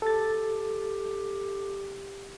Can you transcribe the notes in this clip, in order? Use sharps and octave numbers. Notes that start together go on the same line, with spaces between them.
G4 A4 A6